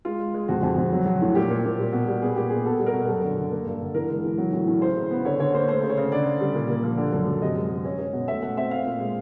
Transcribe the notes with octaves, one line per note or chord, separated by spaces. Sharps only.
G#3 F4
G#3
G#3
F2 F#4
F2
F2
F#3
F#3
A2
A#2 G4
A#2
A#2
G3
B2
G3
B3 G#4
A#2 G4
B3 G#4
B2 A4
G3
A#4
B2
F#2 A4
D3
D3
A#3
G2
D3
E3 A#4
G#3
E3
F#3
A2
A2
C#3 C5
C#3
B3
D3 C#5
D3 C#5
A#3 C5
A3 C5
C#3
C#5
C#3
D3 D5
D3
G3
A#2
A#3
F3
D3
F#2
F#2
C3 D#5
G#3
G#3
C#4
C#4
B2
A3 E5
A3 F#5
C4 E5
C4 F5
A#2
G#3